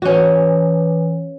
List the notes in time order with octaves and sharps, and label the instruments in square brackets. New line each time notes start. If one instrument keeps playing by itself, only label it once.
[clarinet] E3 [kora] C#4 F#4